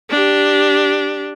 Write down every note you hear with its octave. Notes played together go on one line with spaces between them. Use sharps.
D4 G4